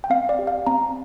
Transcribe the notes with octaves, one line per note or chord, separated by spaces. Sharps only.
G5
C4 F5
D5
G4
F5
C4 A#5